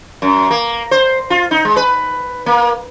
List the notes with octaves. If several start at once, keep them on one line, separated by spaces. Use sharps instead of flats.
F#2
A#3
C5
F4
D#4
G#3
B4
A#3